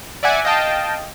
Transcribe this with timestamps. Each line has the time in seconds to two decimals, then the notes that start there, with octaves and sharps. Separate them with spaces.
0.23 D5 E5 F#5 G#5 D6
0.45 D#5 F5 G5 A5